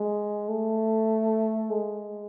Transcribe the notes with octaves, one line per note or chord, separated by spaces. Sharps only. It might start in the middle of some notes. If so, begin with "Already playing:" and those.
Already playing: G#3
A3
G#3